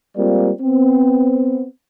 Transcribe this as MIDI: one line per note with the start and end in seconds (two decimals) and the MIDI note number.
0.17 0.51 55
0.17 0.51 56
0.17 0.51 58
0.17 0.51 60
0.17 0.51 65
0.17 0.51 74
0.62 1.66 59
0.62 1.66 60